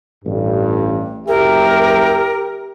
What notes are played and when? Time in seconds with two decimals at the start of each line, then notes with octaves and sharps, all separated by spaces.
0.25 A1 G2
1.28 F#1 G4 A#4 E5